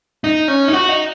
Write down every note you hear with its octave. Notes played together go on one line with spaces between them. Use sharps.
D#4
C#4
D#4
F#4
D#4